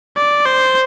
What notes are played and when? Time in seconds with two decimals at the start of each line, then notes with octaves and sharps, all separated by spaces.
0.16 D5
0.46 C5